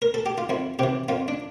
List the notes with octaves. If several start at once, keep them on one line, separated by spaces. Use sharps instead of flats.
A#4
A4
G4
F4
F2 E4
C3 E3 G4
F2 F4
D4